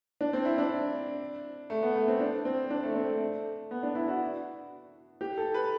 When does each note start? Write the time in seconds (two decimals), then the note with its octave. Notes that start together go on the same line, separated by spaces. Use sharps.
0.21 D4
0.33 C4
0.45 E4
0.58 D4
1.70 A3
1.83 B3
1.96 A3
2.08 C4
2.20 D4
2.45 C4
2.70 D4
2.84 A3
2.96 C4
3.07 A3
3.71 B3
3.83 D4
3.95 E4
4.08 F#4
5.21 G4
5.37 A4
5.54 B4